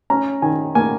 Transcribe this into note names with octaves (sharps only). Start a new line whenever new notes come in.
C#4 A#5
D#3 G#5
A#3 G#5